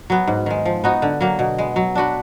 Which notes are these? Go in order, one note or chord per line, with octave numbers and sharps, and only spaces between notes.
F#3 B3
G#2
D#3 G#3
F3
B3 D#4 F#4
D3
F#3 A#3
B2
G#3 B3
F#3
D4 F#4 B4